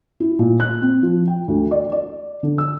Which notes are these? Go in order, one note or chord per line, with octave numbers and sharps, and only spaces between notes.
E4
A#2
F#6
C4
F3
G5
D2
D5
D5
D3
E6